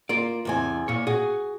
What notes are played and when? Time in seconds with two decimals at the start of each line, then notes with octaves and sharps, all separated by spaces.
0.09 A#3 F4 D5
0.45 E2 C3 G#5
0.88 A#2 C#5
1.07 F#4 G#4